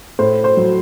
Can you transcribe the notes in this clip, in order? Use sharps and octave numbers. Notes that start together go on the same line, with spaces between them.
A2 C5
C5
F#3